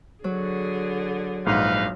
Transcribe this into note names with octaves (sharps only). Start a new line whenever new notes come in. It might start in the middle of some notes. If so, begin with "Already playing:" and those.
D3 F#3 G#4
A#1 G#2 D#4 B4 F5